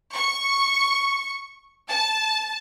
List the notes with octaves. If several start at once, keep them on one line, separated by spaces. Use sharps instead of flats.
C#6
A5